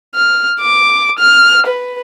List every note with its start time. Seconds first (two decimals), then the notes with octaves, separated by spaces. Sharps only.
0.15 F6
0.61 D6
1.19 F6
1.66 B4